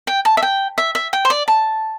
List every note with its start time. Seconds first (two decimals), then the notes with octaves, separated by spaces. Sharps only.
0.07 G5
0.25 A5
0.37 E5
0.43 G5
0.78 E5
0.95 E5
1.13 G5
1.25 C5
1.30 D5
1.48 A5